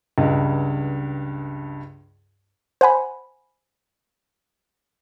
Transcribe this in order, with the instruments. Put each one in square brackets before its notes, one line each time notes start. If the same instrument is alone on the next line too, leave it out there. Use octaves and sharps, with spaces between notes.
[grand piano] C#2 G2
[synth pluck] C5 F#5 G#5 B5